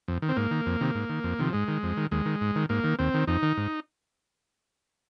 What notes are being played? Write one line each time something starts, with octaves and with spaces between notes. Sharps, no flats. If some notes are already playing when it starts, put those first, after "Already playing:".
F2
D#3
C4
G#2 A#3
D#3
F2
C3 D#3
G#2
D#3
F2
C3 D#3 F3
G#2 G#3
D#3
F2
D#3
D#2 G#3
D#3
G#2
D#3
G#2 A#3
D#3
D#2 C4
D#3
F2 D#4
D#3
G#2